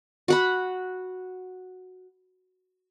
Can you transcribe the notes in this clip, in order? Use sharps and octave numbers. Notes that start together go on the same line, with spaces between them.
F#4 F#5 B5